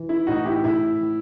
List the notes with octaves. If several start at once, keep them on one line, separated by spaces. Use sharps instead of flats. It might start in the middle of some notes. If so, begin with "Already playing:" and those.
Already playing: E3
E4
A2 D#4 F#4
E4 G4
A2 E4
E3